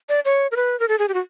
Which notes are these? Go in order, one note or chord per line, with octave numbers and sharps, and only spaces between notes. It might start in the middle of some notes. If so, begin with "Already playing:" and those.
D5
C#5
A#4
B4
A#4
A4
G#4
G4
F#4